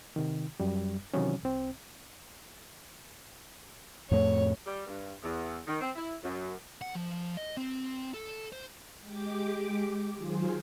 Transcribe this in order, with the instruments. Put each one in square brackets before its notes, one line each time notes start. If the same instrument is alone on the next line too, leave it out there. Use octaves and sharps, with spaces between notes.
[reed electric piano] C3 D#3
F#2 G3
C3 D#3 E3 F#3 C#4
C2 C4
[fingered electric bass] F2 A2 A3 [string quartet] C#5
[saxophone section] G3
G2
E2
D#3
C4
E4
F#2
[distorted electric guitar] F#5
F3
D#5
C4
A4
C5
[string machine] G#3 G4 D6
D#3 F#3 F4 G#4 C5